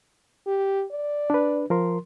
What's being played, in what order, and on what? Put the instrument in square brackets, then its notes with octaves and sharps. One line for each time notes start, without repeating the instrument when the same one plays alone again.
[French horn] G4
D5
[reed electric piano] D4 B4
F3 A#4 C6